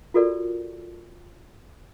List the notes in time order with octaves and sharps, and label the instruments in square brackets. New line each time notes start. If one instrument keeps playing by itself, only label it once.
[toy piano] F4 F#4 A4 A#4 D5